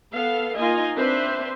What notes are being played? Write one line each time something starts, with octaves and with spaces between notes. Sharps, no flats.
B3 A4 F5
A#3 D#4 F4 D#5 G#5
C4 D4 B4 C5 E5